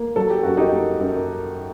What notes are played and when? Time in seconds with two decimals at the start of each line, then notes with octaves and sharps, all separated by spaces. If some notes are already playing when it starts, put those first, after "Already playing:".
Already playing: A#3
0.16 F#3 A4
0.30 G4
0.43 F#2 F#4
0.57 D#4 G4
0.73 A#3
1.00 F#2